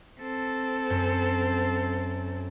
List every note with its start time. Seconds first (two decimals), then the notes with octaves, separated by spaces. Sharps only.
0.20 C4 A4
0.90 F#2